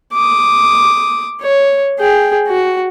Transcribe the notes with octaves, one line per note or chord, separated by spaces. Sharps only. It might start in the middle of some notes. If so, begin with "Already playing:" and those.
D6 D#6
C#5
G#4 G5
F#4